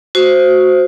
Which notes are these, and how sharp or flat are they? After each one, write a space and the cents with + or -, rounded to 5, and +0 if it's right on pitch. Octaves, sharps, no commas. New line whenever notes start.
F#4 +0 C5 +0